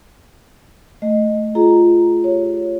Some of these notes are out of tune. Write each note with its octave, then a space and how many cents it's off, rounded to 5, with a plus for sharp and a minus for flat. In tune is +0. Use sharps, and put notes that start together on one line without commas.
A3 +0 D#5 -5
F4 -5 G#4 +20 A#5 +0
G4 +10 C#5 +0